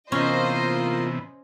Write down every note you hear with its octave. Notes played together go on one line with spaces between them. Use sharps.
C3 E3 A#3 B3 C#4 F4 C5 D#5